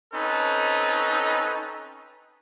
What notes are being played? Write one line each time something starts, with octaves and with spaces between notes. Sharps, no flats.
C4 C#4 D#4 A4 B4